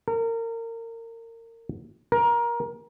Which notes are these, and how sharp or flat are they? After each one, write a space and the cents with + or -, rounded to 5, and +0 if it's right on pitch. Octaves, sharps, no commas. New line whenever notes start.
A#4 -30
A#4 +20